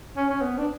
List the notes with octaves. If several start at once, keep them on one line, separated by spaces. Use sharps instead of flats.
C#4
C#4
B3
D4